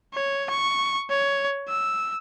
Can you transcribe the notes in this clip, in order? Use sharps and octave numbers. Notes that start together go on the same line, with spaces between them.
C#5
C#6
C#5
E6